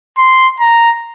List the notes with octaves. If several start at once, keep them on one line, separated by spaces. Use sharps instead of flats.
C6
A#5